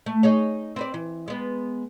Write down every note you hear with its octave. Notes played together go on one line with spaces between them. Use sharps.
A3
D#4 G#4 C#5
C4 B4 D5
E3
G#3 B3